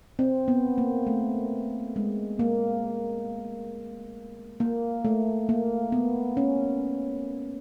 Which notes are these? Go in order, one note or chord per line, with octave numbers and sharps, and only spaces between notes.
C4
B3
A#3
A3
G#3
A#3
A#3
A3
A#3
B3
C#4